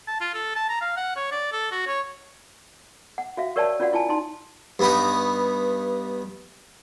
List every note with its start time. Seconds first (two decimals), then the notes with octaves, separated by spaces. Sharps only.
0.07 A5
0.20 F4
0.34 A4
0.55 A5
0.69 A#5
0.81 F5
0.97 F#5
1.16 C#5
1.31 D5
1.52 A4
1.71 F#4
1.86 C#5
3.18 F#5
3.37 F#4 E5 F5
3.56 G4 A#4 C#5 D5 G5 A5
3.80 C#4 F4 F#4 D5 F5 F#5
3.93 E4 F4 G#5 A5
4.09 D#4 A5 C6
4.79 G2 B3 D#4